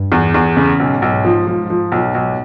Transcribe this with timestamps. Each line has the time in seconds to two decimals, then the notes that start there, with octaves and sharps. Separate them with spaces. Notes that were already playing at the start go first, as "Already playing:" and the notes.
Already playing: G2
0.12 E2
0.34 E2
0.57 C#3
0.79 B1 G#2
1.02 B1
1.25 F3
1.47 F3
1.70 F3
1.92 B1
2.15 B1